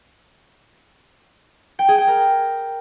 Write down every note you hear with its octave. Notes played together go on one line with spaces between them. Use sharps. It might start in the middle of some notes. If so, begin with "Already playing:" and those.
G5
G#4
G5
A#4